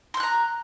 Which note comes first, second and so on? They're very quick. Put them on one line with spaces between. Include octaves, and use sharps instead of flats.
C6 G6 F#6 A#5